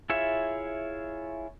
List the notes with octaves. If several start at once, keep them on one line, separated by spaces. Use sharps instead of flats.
E4 F4 G#4 C#5 E5